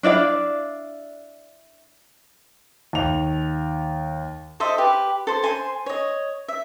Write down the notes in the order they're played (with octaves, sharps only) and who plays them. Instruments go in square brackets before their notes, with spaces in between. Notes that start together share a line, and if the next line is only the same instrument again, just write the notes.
[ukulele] D4 E4 D5 F5
[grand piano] D#2 F7
[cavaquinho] A4 C5 D#5 E5
G4 B4
A4 C5
C5 G#5 A5 C6
C#5 D#5
E5